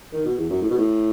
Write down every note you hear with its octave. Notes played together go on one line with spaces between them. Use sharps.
D#3
B2
E2
F#2
A2
B2
A2